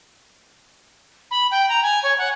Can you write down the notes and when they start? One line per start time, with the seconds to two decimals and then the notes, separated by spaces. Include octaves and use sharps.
1.31 B5
1.51 G5
1.69 A#5
1.83 G#5
2.03 C#5
2.18 F#5